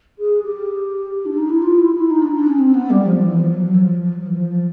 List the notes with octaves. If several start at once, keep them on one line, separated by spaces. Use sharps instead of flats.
G#4
G4
D4
D#4
E4
F4
E4
E4
D#4
D4
D4
C#4
C4
B3
G3
F3
E3
F3
F#3
E3
F3
F3
F#3
F3
E3
F3
F3